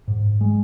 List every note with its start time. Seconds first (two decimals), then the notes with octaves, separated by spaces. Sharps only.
0.08 G#2
0.41 G#3